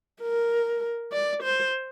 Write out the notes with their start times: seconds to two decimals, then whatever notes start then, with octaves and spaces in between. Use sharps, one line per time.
0.22 A#4
1.12 D5
1.43 C5